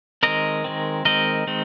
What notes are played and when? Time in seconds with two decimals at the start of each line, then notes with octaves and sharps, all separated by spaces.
0.23 D#3 G#3 C4 A#4 D#5
0.64 D#3 G#3 C4
1.05 D#3 G#3 C4 A#4 D#5
1.47 D#3 G#3 C4